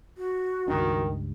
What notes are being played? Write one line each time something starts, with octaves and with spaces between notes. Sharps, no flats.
F#4
C#2 G2 D#3 D4